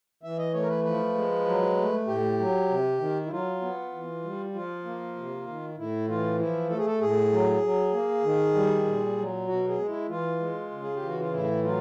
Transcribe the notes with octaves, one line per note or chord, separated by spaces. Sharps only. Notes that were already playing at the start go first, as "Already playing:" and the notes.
E3 E5
D#5
A3 C#5
A#4
B4
F3 B4
G#3
F#3
A3
A2 G4
F#3
C3
D#3
E4
F#3 F4
B3
E3
G3
F3 F4
A#3
C3
D#3
A2 E4
E3 F4
F3 E4
A3 A4
G#4
A4
A2 G#4
F#3
F#3
A#3
D#3
G3
A#2
F#3
B2 F#4
G#4
G#3
E4
E3 F4
G#3
C#3
G#4
G4
E3
F#4
F4
A2 E4
F#3 F4